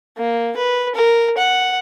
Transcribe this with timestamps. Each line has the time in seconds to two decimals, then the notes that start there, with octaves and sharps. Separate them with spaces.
0.18 A#3
0.57 B4
0.95 A#4
1.38 F#5